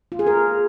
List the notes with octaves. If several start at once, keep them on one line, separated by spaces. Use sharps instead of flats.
F4
G#4
A#4